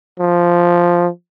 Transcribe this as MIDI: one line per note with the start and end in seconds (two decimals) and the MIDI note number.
0.20 1.08 53